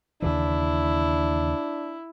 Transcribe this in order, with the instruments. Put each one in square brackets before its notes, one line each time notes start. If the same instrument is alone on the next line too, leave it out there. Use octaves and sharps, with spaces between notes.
[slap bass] D#2 C#3 E3 [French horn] D4 [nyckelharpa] E4